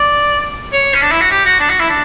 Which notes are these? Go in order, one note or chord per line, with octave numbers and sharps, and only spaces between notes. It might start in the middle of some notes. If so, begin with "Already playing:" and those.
Already playing: D5
C#5
C#4
D4
E4
F#4
G4
F#4
D4
F#4
E4
D4